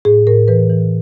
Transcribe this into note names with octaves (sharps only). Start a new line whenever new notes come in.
A2 G#4
A2 A#4
E3 B4
E3